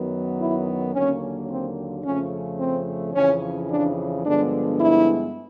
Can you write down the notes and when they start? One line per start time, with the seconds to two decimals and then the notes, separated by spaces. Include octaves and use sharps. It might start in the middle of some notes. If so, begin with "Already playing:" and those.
Already playing: F#2 D#3 F#3 B3
0.40 E4
0.94 D#2 D3 F#3 A#3 C#4
1.50 C4
2.05 F2 C#3 F3 A3 C#4
2.60 C4
3.15 F2 C#3 E3 C#4
3.70 D4
4.25 G2 D3 F3 G#3 B3 D4
4.80 E4